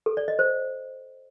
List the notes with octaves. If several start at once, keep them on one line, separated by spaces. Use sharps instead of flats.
A4
D5
D#5
C5